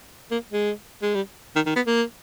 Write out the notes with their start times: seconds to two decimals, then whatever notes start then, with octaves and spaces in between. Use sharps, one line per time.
0.31 A#3
0.52 G#3
1.02 G#3
1.15 G3
1.56 D#3
1.66 D#3
1.76 B3
1.87 A#3